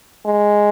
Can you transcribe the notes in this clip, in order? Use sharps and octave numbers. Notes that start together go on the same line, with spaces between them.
G#3